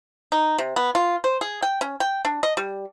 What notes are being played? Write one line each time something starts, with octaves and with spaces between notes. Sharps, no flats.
D#4
C3
B3
F4
C5
G#4
G5
C#4
G5
D4
D#5
G3